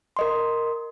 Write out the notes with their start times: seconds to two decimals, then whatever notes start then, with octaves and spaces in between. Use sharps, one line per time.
0.17 A#4 D#5 C6